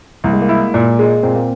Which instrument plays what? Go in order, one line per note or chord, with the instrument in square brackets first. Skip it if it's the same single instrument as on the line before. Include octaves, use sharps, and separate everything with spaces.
[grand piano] C2 [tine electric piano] A#3
[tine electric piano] G#3
A#3
[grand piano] E4
A#2
G#3
[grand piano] A#2 [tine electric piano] C4
[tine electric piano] A#3